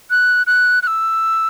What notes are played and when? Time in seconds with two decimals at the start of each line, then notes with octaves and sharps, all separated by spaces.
0.10 F#6
0.47 F#6
0.83 F#6
0.87 E6